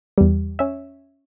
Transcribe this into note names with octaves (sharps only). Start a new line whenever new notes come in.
E2 G3
C#4 E5